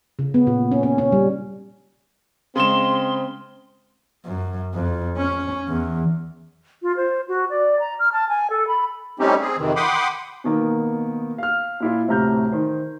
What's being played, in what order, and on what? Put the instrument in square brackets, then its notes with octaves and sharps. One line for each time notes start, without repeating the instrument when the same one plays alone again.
[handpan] C#3
B3
A#2
C#4
C#4
C#4
G3
[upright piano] C#3 E7 [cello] G#3 [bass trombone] C4 [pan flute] C6
[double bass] F#2
F2
C#4
E2
[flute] F4
C5
F#4
D5
A#5
F6
A5
G#5
A4
B5
[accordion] G3 A3 C4 C#4 D#4 G4
C4 G#4
F2 C3 D#3 E3
F#5 G5 B5 C6 D6 D#6
[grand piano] B2 D#3 A#3 B3
F5 F6
A#2 E4 F4
D2 A2 C3 A#5 F6 G6
D#3 C5